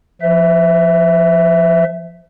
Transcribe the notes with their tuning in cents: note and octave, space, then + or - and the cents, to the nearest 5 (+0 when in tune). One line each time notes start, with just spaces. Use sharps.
F3 -5 B4 +45 E5 +0